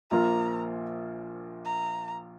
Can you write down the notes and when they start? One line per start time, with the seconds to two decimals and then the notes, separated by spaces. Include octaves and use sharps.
0.10 A#1 A#2 F3 A#3 F4 A#5
1.65 A#5